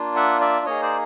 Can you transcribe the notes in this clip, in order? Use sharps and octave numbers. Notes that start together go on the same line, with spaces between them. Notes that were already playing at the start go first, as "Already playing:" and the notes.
Already playing: A#3 D4 F4
E5 F#5
D5 E5
A#3 D#4 G#4 C#5 D#5
C5 D5